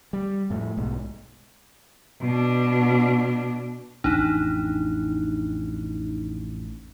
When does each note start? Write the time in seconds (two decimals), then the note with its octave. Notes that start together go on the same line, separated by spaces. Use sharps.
0.13 G3
0.50 F2 A2
0.77 B1 G#2
2.21 B2 D4
4.04 A1 F2 D4 D#4